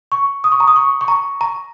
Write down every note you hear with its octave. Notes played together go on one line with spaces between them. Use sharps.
C#6
D#6
C#6
A#5
D#6
C#6
C#6
A#5
A#5